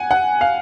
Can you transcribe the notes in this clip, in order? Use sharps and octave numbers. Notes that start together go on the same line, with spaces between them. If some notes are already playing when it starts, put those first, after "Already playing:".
Already playing: F#5 G#5
F#5
F5